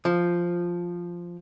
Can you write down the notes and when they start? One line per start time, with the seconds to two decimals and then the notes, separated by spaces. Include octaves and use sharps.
0.05 F3